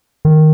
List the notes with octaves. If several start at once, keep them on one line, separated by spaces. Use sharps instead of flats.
D#3